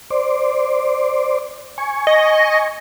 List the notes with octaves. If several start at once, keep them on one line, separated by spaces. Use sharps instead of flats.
C5 D5
G#5 C#6
D#5